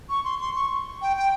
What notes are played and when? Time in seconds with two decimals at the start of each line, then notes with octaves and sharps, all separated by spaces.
0.10 C#6
0.24 C6
0.40 C6
0.56 C#6
1.02 G5
1.17 G5